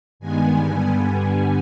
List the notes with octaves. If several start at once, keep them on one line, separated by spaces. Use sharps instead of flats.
G2 D#3 G#3 B3 G#5
G2 D3 G3 B3